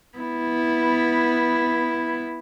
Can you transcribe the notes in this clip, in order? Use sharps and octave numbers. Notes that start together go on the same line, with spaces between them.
B3 E4